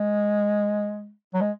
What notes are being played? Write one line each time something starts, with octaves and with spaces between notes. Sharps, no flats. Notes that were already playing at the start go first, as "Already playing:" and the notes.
Already playing: G#3
F#3
G#3